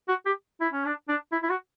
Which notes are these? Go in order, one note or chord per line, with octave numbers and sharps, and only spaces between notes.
F#4
G4
E4
C#4
D4
D4
E4
E4
F#4